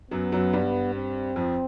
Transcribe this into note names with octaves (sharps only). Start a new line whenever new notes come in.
F#2 F#3 B3
F#2 F#3
G2 G3
C4
F2 F3